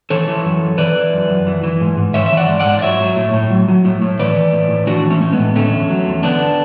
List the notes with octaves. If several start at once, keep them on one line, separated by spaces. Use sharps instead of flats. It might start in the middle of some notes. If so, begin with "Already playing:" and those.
E3 A4 C#5
E3
F#2
F#2
E3 B4 D5
E3
F#2
F#2
E3
E3
G#2
G#2
E3 C#5 E5
E5
E3 D5 F#5
G#2
D5 F#5
G#2
D5
F#3 C#5 E5
F#3
A2
A2
F#3
F#3
A2
A2
E3 B4 D5
E3
A2
A2
E3 D4 F#4
E3
A3 C#4
A2 C#4
G#3 B3
A2
D3 A3 C#4
E2
F#3
E2
D3 B3 D4